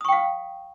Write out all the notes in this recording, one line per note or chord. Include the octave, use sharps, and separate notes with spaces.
F5 G5 C#6 D#6